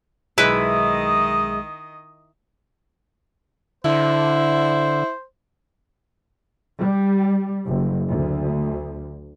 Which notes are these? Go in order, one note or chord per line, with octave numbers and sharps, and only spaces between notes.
B1 D#3 G#3 E4 B4 D#5 E5
D3 E4 C5
G3
F#1
D2